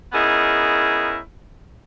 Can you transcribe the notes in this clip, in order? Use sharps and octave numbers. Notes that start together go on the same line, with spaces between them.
B3 C#4 D#4 E4 G#4 A#4